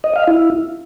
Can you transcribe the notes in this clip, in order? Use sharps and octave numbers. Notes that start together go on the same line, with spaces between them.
D#5
F5
E4